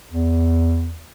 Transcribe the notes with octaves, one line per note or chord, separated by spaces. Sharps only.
E2